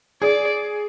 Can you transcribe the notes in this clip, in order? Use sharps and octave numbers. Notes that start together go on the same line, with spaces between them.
G#4 D5